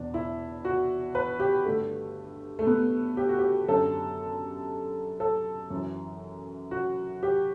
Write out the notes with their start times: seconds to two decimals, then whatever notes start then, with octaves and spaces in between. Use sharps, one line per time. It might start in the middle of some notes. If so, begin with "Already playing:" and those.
Already playing: E2 B2 D4
0.14 E4
0.65 F#4
1.15 B4
1.40 G4
1.65 G2 D3 A3
2.59 A3
2.67 B3
3.17 G4
3.29 F#4
3.38 G4
3.68 F#2 D3 A4
5.20 A4
5.70 F#2
5.75 E3
6.71 F#4
7.23 G4